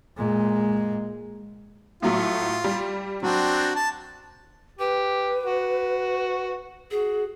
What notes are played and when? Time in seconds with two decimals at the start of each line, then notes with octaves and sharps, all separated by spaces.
0.17 A#2 G#3
2.02 A2 F#3 A3 F4
2.64 G3
3.23 F#3 C4 D4 F#4
3.76 A5
4.79 G4 B4
5.44 F#4
6.91 F#4 G#4